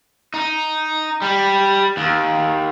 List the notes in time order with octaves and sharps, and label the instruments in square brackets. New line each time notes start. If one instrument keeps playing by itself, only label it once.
[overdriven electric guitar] D#4
G3
D#2